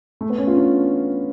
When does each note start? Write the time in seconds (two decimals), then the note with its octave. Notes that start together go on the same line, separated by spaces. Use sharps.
0.21 A3
0.30 B3
0.38 C#4
0.47 F4
0.56 D4